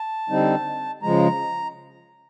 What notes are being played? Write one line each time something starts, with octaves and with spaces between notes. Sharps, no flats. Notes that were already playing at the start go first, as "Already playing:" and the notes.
Already playing: A5
D3 G3 C4 D#4
C#3 F3 G#3 A#5